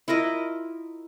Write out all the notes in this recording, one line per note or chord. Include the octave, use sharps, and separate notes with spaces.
E4 F4 A#4 D#5